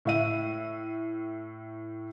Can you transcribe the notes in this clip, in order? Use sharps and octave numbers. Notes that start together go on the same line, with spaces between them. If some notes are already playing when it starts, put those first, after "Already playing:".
A2 E5 D#7